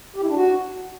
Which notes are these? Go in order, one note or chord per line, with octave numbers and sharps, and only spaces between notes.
G4
E4
D4
F#4